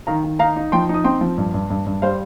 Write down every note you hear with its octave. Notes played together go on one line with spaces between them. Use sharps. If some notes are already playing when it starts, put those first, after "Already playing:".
D#3 F5 A#5
D#3
D#4 F5 A#5
D#4
F3 G5 C6
D#4 D#6
C4 G5 C6
F3
G2
G2
G2
G2
G3 C5 F5